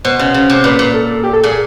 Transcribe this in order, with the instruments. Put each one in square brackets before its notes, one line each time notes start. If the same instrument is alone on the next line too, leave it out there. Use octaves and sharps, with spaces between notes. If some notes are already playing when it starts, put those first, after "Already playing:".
[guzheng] B2 [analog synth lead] C5
[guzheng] C#3
C#3
[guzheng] C3 [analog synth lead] C5
[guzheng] A#2 [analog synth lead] B4
[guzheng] A#2
[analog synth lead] A4
G4
A4
[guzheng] A#2 [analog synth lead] G#4